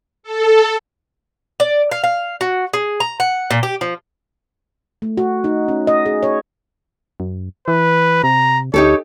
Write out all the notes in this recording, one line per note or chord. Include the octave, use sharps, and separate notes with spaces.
A4
D5
F5
F5
F#4
G#4
A#5
F#5
A#2
G4
F3
A3
F#4
D#4
C#4
D#5
G#4
C#5
F#2
E3 B4
C3 A#5
D2 D#4 G4 A4 C#5